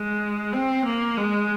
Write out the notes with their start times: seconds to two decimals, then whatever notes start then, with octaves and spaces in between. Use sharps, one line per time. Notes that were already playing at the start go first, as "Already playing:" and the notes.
Already playing: G#3
0.53 C4
0.85 A#3
1.17 G#3